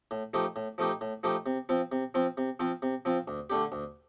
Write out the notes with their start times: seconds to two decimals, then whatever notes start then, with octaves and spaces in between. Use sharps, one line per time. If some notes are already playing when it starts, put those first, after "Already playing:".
0.11 A2
0.34 F3 A3 D#4 G4
0.56 A2
0.78 F3 A3 D#4 G4
1.01 A2
1.23 F3 A3 D#4 G4
1.46 C3
1.69 F3 C4 F4
1.92 C3
2.14 F3 C4 F4
2.37 C3
2.60 F3 C4 F4
2.82 C3
3.05 F3 C4 F4
3.28 D2
3.50 D3 A3 D4 G4
3.72 D2